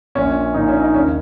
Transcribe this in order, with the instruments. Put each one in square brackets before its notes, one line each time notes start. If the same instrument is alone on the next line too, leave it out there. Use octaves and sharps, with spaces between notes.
[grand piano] A#1 A#2 C#4
A#1 A#2 D#4
C#4
D#4
D#2 C#3 C#4